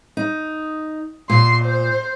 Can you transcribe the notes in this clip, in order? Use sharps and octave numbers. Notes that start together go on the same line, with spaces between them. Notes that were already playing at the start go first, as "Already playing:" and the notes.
D#4
A#2 C6
C5